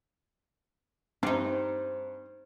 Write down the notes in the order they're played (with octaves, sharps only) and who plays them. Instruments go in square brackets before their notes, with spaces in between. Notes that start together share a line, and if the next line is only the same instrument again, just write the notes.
[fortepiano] G2 [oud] C4 D#4